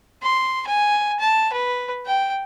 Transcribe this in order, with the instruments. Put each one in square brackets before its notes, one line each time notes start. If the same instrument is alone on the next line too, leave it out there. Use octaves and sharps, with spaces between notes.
[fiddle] C6
G#5
A5
B4
G5